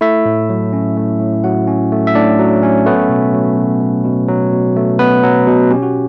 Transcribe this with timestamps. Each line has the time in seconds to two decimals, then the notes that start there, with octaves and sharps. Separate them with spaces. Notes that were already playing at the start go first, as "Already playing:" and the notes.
0.01 A3 E4 E5
0.26 A2
0.50 F#3
0.73 C#4
0.97 A3
1.20 A2
1.44 F#3 F#4 F#5
1.67 C#4
1.92 A3
2.07 E5
2.15 A2 D4 D5
2.39 F#3
2.63 C#4
2.86 A3 B3 B4
3.09 B2
3.34 F#3
3.57 B2
3.81 A3
4.04 B2
4.28 F#3
4.53 B2
4.76 A3
4.99 B2 B3 B4
5.23 F#3
5.47 B2
5.71 C#4 G4
5.83 F#4